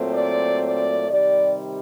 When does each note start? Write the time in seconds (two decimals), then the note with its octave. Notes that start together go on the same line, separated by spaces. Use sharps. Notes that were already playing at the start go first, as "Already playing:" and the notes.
Already playing: A#2 F#3 A3 C4
0.13 D5
0.61 D5
1.10 C3 D#3 G3 D5